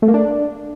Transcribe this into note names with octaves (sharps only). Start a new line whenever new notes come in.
A3
A#3
D4